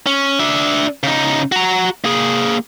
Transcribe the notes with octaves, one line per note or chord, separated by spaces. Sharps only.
C#4
D4 E5
C#3 D#4
F#4 A#5
A#3 G#4